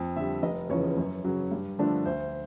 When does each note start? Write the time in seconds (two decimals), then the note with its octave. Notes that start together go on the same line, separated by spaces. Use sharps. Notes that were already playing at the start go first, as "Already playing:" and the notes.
Already playing: F2
0.16 D3 E5
0.20 G3
0.43 F1 D#5
0.70 E2 C#3 F3 C#5
0.97 F#2
1.24 C#3 F#3
1.51 G2
1.79 D3 F3 A3 D4
2.05 D2 C5